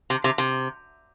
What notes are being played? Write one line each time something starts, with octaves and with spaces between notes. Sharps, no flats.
C3
C3
C3